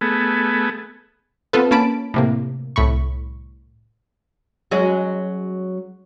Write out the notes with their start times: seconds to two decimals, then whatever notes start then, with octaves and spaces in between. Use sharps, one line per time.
0.01 A3 B3 G#4
1.53 B3 C4 F4 A4 B4
1.71 A#3 C#4 A5 B5 D7
2.14 A2 C3 A#3
2.76 C2 A2 B5 C#6
4.71 F#3 G#3 C#4